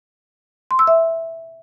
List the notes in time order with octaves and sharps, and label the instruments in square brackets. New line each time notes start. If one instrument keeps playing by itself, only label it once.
[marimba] C6
E6
E5